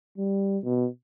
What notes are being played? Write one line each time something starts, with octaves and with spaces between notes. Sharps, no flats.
G3
B2